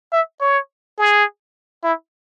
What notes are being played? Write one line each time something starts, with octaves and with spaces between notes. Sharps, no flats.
E5
C#5
G#4
E4